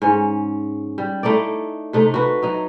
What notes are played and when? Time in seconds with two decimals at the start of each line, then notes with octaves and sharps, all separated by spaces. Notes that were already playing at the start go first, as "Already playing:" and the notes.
0.02 G#2 C#4
0.98 G3
1.23 A3 D#4 E4 D5
1.93 C3 A3 D#4
2.14 F#4 B4
2.42 F#3 D#4